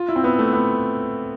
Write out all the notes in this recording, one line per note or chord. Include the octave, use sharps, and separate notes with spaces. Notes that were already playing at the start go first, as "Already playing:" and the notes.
Already playing: F4
E4
C4
B3
A3
B3